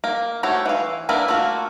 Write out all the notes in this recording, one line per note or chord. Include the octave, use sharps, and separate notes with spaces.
A#3
A3 F#4 G4 C5 C#5
E3 F5
A#3 D4 E4 A#4 B4
A3 A#3 F4 F#4